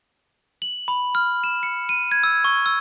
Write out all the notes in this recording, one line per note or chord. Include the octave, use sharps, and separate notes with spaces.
F#7
B5
F6
E7
C#7
D#7
G#6
E6
C#6
E6